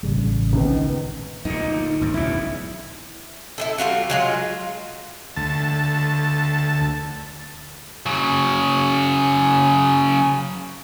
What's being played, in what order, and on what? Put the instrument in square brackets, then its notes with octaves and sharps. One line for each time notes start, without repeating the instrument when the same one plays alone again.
[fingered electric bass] A1 C#3 G3
[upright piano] C#2 D#3 B3
[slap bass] D2 A#2 [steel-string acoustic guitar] D#4
[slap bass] G#1 F#2
[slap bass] B1 E2 C#3 [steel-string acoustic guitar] E4
[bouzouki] E4 G#4 A4
G3 A#3 F4 F#4
F#3 G#3 F4
[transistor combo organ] D2 A5
[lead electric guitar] C#3 F#3